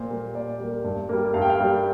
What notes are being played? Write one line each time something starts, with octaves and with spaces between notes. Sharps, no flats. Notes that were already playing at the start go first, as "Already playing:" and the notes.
Already playing: A#2 C5
G3 A#3
A#2 D5
G3 A#3
G2
G3 A#3
G2 F5
G5
F5
G3 A#3